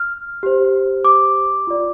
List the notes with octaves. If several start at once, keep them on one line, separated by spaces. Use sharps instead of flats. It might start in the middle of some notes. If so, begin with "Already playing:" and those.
Already playing: F6
G4 C5
D6
F4 D5